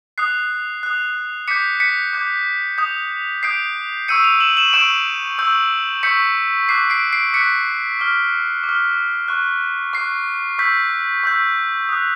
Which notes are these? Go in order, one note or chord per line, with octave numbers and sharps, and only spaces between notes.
D#6 F#6 C7
D#6 F#6
D6 G6 B6 C#7
B6 C#7
D6 G6
D#6 G6
D#6 G6 C7 D7
C#6 E6 G6 C#7 D#7
D#7 F7
E7 F#7
E7 F#7
C#6 E6 G6 D7 E7
C#6 E6 G6
C#6 E6 G6 B6 C#7
D6 F#6 C7
C7 D7
C7 D7
D6 F#6 B6 C#7
D6 F6
D6
F6
C#6 F#6
C#6 F#6 C7
C#6 E6 G6 B6
C#6 E6 G6
D#6 F#6